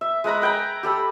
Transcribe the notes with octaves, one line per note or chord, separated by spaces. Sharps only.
E5
G#3 B4 A#5 B5
B4 G5 G#5 A#5
G4 A4 B5